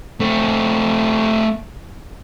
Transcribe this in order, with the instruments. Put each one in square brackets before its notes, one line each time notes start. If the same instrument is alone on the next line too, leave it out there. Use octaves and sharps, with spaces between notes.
[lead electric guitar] A3 C4